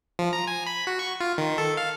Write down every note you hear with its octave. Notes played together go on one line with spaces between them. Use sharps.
F3
A#5
G#5
B5
F#4
C#6
F4
D#3
A4
F5